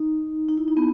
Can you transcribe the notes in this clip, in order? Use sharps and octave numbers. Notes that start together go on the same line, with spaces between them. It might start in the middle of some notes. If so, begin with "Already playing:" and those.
Already playing: D#4
D#4
E4
D#4
B3